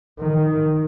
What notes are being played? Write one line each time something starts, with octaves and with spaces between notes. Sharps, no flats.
D#3